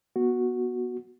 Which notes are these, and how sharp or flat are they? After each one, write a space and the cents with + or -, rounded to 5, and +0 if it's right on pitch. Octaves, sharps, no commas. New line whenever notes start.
B3 -20 F#4 -5